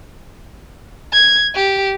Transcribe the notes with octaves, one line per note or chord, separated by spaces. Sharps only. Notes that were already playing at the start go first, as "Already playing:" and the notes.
G#6
G4